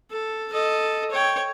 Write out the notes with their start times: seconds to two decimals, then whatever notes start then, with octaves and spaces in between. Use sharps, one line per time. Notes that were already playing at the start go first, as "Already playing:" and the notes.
0.11 A4
0.52 A4 D#5
1.11 C#5 G5